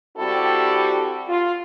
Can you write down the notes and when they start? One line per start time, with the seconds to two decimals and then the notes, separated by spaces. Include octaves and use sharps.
0.18 G3 C4 E4 F#4 G4 A4
1.28 F4